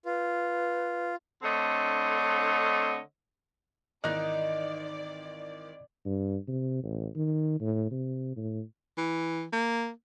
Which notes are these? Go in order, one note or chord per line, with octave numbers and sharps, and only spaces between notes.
F4 B4
D3 A3 C4 D4 C#5 D#5
G#1 D#3 E3 D#4 D5 D#5 F#6
G2
C3
A1
D#3
A2
C3
A2
E3
A#3